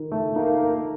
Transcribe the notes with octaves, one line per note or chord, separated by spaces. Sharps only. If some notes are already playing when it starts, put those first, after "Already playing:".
Already playing: D#3
A3
A#3 D#4
A#4